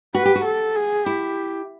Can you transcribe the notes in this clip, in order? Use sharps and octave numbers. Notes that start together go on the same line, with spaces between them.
F#4 B4
G4
F#4
A4
G#4
E4 G4